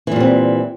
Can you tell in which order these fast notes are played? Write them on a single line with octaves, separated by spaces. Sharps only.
E3 A#2 G3 C4